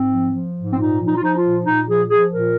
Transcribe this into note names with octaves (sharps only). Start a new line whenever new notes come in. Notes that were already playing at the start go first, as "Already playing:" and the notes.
Already playing: G#2 C4
F3
F3
G#2
C4
A#2 D#4
F3
D#4
F4
F3 D#4
F4
A#2
A#2 D#4
F3 G#4
F3 G#4
A#2 A#4